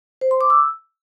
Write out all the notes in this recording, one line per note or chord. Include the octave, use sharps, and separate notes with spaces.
C5
C6
D6
E6